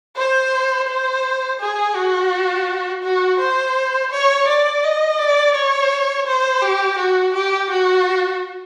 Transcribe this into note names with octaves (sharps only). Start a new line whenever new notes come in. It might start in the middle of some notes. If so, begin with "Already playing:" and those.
C5
C5
G#4
F#4
F#4
C5
C#5
D5
D#5
D5
C#5
C5
G4
F#4
G4
F#4